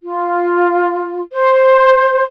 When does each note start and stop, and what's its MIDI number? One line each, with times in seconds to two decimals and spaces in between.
0.03 1.21 65
1.32 2.23 72